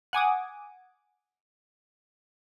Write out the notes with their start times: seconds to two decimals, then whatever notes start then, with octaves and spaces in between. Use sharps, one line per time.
0.13 F#5 G#5 D6 D#6